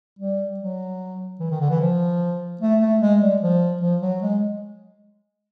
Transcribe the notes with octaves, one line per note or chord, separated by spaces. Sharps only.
G3
F#3
E3
D#3
D3
E3
F3
A3
A3
G#3
G3
F3
F3
F#3
G#3